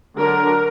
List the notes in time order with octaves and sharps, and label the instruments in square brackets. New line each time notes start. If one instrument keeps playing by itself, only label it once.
[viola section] D3 F#3 D4 A#4